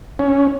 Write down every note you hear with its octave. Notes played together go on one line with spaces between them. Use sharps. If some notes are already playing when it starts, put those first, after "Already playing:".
C#4